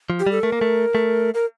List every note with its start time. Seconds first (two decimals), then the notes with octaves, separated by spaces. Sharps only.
0.10 F3
0.20 G4
0.27 G3
0.32 A4
0.43 A3 A#4
0.52 A#3
0.61 A3
0.95 A3
1.34 A#4